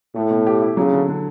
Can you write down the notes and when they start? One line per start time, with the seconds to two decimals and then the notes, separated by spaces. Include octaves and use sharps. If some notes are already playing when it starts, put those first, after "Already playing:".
0.15 A2 A3
0.30 B2
0.47 G4
0.62 E4
0.77 C#3 F#3
0.93 D3
1.08 D3